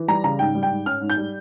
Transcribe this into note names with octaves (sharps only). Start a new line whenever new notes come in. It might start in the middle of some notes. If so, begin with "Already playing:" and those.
Already playing: E3
G3 A#5
C#3 A#5
G#2 G5
G3
G5
G#2
C#4 F6
G#2
G6
G3